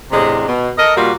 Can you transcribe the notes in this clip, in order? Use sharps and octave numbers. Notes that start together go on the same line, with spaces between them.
E2 A2 C3 G#3 D4
B2
A4 A#4 D#5
A#2 G3 A#3 F4 F#4